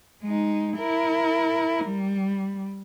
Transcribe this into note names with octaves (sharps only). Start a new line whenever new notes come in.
G#3 D#4
E4 A#4
G3